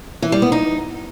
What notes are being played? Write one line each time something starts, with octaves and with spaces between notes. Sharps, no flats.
E3
G3
B3
D#4